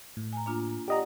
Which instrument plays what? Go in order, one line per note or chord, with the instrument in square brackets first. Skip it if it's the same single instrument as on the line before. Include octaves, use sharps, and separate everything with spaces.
[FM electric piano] A2
[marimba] G#5 A#5
A#3 D4 F4
[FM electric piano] G4 D#5 A#5 [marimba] D5 F#5